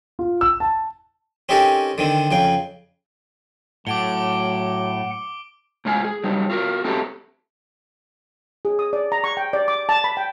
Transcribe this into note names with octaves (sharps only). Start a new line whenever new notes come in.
F4
E6
A5
C4 C#4 D#4 G4 A4 A#4
D3 D#3 C4
F2 C#3 G5
A2 F#3 F#5 D6 D7 G7
A2 G#3 D4 F4 G#5
G#4
F#3 G3 D#4
F4 F#4 A#4
A3 C4 D#4 F#4 G4 A4
G#4
D#6
D5
A#5
C#6
G5
D5
D6
A5
B5
G5